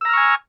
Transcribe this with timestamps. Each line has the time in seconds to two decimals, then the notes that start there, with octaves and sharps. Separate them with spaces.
0.01 E6
0.05 A#5
0.09 F6
0.13 C#6
0.17 G#5